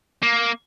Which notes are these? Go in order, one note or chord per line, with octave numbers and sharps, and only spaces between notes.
A#3